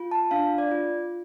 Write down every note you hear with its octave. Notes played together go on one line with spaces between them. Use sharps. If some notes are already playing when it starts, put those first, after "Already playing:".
Already playing: F4
A5
D4 F5
D5
F4